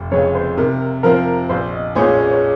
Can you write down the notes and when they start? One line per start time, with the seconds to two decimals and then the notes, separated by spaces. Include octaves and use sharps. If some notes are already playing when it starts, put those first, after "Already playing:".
Already playing: F1
0.11 F2 C#3 G#3 C#5
0.35 C5
0.58 C3 A#4
1.03 F3 C4 A#4
1.49 A#1 C5
1.72 D#5
1.95 A#2 G#3 C#4 G#4 C5
2.19 C#5
2.31 C#5